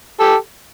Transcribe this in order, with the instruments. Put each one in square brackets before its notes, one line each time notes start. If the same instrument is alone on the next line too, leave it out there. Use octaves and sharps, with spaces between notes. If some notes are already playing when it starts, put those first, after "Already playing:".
[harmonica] G4 A4